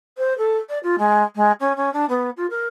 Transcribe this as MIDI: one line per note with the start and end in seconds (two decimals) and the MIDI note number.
0.18 0.36 72
0.38 0.57 69
0.69 0.79 74
0.83 0.95 65
0.98 1.23 56
1.35 1.51 56
1.60 1.76 61
1.76 1.91 61
1.93 2.05 62
2.09 2.30 59
2.37 2.46 65
2.50 2.67 70